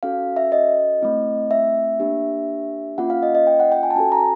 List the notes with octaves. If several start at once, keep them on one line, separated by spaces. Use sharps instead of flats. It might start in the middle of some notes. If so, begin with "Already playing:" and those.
C#4 F#4 A4 F5
E5
D#5
A3 C4 E4
E5
A#3 D4 G4
A#3 C#4 F4 F#5
F5
D#5
D#5
G5
F#5
G5
G#5
A5
C#4 F#4 A4 G#5
A#5